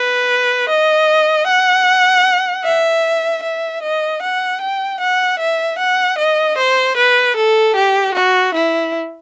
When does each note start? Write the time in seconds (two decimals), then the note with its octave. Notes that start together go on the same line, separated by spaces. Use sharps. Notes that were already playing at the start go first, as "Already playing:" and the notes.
Already playing: B4
0.69 D#5
1.47 F#5
2.64 E5
3.43 E5
3.83 D#5
4.22 F#5
4.61 G5
5.00 F#5
5.39 E5
5.79 F#5
6.18 D#5
6.58 C5
6.97 B4
7.36 A4
7.76 G4
8.14 F#4
8.54 E4